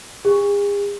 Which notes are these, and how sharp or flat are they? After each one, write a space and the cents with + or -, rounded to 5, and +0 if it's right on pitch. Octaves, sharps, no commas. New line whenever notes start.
G#4 -40